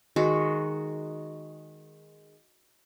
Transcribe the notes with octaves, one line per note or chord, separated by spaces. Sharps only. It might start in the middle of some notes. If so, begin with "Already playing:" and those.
D#3 G#3 F#4